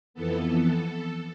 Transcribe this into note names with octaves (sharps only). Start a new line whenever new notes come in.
F2 E3 B3 A4